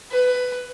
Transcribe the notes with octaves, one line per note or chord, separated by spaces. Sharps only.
B4